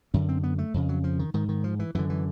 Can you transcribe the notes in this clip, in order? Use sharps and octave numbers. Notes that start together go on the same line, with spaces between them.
F#2 D3 C#4
C4
B3
A3
F2 C#3
F#3
F3
D#3
G#2 D#3
D#3
F3
E3
F#2 D3 E3
E3